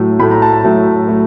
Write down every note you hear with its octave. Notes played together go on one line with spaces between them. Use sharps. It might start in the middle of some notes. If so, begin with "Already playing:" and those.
Already playing: A2 F#3 A3
A2 F#3 A3 B5
A#5
A5
A5
A2 F#3 A3
F#3 A3